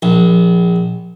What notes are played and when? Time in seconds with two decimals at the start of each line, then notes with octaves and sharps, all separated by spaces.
0.02 A#1